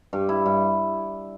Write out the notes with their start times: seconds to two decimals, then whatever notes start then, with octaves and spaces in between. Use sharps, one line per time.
0.13 G2
0.29 E4
0.46 G2